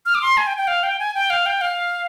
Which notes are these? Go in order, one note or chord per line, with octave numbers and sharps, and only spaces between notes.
F6
D6
C6
G#5
G5
G5
F5
G5
G#5
G5
F5
G5
F5